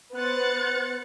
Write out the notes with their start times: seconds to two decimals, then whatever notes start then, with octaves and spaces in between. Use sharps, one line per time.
0.14 B3 C5 F#6 A6 C#7